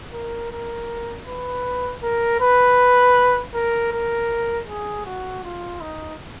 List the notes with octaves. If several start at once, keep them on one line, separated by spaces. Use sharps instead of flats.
A#4
A#4
B4
A#4
B4
A#4
A#4
G#4
F#4
F4
D#4